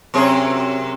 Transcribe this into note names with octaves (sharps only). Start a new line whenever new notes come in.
F#2 C3 G#4